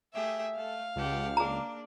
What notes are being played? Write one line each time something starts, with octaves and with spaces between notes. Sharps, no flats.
A3 G4 G#4 E5
A3 A4 F5
C#2 G4 F#5 A5
A#3 D4 G#4 A#5